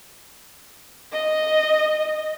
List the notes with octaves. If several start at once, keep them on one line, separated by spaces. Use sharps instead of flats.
D#5